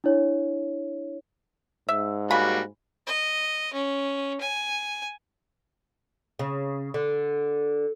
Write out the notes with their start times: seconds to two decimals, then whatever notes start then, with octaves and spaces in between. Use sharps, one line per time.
0.04 D4 E4 C#5
1.89 G#2 E5
2.31 C#3 G3 A#3 F#4 B5
3.07 D#5
3.74 C#4
4.41 G#5
6.39 C#3
6.94 D3